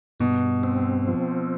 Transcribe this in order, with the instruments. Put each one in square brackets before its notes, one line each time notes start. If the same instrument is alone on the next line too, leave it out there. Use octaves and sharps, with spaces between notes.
[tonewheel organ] G2 [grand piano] B2
[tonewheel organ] C4
F3